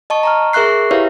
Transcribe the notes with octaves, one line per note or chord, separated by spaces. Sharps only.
D#5 A5 C#6
A#5 C#6 F6
G#4 A#4 E5 C#6 F#6 C7
E4 G4 B4 C#5 E5 F5